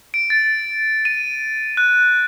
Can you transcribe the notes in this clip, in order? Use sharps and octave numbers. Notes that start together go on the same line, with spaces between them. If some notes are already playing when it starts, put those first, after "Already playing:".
D7
A6
D#7
F#6